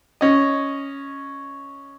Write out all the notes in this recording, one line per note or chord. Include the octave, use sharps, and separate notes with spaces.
C#4 D#5